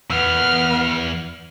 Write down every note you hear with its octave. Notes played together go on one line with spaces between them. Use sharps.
E2 B3 F6